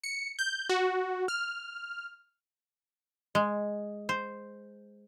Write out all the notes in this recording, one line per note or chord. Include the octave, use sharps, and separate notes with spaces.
C#7
G6
F#4
F6
G#3
C5